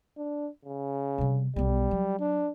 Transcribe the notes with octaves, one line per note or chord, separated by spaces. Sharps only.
D4
C#3
C3 G3
B1 G3 B3
F#3
D4